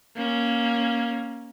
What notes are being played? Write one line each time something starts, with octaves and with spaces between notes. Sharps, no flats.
A#3 C#4